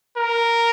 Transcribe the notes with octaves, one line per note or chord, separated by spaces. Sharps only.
A#4